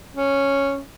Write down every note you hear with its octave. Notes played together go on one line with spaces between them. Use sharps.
C#4